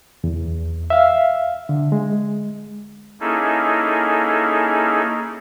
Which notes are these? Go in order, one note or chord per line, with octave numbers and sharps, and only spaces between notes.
E2
E5 F5
D3
G#3
A#3 C#4 D#4 E4 G#4 A4